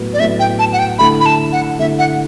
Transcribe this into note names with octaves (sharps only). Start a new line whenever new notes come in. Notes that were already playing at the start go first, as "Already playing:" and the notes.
Already playing: A2 F#3 B3
D5
A2 F#3 B3 E5
G5
A5
F#5
G5
D3 A3 E4 B5
B5
A5
F#5
D3 A3 E4 E5
F#5